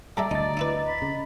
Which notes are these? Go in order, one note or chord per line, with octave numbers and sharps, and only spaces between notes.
G3 G#3 D5 E5 A5 A#5
D2 D#4 D#5 A#5 A6
D#4 E4 B4
B5
C#3